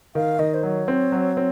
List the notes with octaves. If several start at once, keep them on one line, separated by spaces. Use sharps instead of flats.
D#3 F5
D#3 D#5
C5
F#3 C#5
C4
F#3
C4